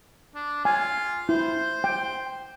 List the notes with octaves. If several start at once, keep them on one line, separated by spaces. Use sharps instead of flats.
D4
F4 G#5
E4 C5
G5